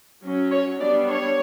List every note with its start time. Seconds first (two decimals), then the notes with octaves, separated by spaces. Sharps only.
0.24 F#3 C#4
0.52 C#5
0.79 G3 B3 D4 D5
1.08 C#5